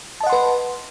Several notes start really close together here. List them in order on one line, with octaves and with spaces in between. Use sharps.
A5 D#5 F#5 C6 B4